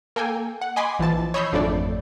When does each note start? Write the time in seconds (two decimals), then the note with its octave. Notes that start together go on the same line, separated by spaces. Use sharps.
0.16 A#3 A4 G5 G#5
0.61 F#5
0.76 D#5 G#5 B5 C6 D6
0.99 A#1 E3 F3 A5 A6
1.34 C#5 D#5 B5 E6 G6 C7
1.53 G#1 F2 A3 D4 A4 D5